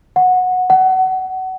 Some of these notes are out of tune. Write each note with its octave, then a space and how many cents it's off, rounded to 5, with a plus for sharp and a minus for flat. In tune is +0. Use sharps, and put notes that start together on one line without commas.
F#5 -15
F#5 +25